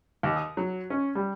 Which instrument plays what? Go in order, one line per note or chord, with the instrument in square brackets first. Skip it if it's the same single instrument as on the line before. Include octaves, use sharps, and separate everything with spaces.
[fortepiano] D#2
D#6
F#3
C#4
G3